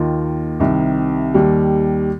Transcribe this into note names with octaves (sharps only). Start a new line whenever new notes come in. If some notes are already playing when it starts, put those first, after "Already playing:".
Already playing: D#2 D#3 A#3 F4
C2 C3 D#3
D#2 D#3 G3